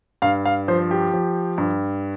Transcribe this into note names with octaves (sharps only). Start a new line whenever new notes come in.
G2 F5
F5
F3 C5
G4
F3
G2